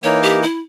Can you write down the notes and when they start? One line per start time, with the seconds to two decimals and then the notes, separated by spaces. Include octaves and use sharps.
0.03 E3 A#3 D#4 A#4 C#5
0.23 G4
0.43 E4